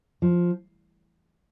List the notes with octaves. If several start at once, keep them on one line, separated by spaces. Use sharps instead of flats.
F3